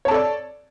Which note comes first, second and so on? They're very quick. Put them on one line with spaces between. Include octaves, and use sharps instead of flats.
C#5 A5 A4 D5